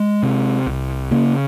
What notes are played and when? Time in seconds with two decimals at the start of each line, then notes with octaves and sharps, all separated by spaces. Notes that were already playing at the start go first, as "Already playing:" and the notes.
Already playing: G#3
0.23 C3
0.67 C2
1.11 C#3 A#3